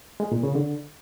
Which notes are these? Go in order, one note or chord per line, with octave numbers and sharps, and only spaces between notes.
G#3
A#2
C#3
D3